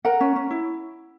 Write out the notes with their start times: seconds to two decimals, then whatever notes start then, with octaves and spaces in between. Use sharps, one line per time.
0.05 A#4 F#5 A#5
0.21 C#4
0.36 C#4
0.51 E4